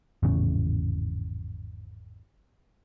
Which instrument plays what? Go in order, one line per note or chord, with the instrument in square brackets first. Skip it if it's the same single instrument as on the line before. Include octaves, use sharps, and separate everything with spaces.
[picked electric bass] G#1 E2 A2 C#3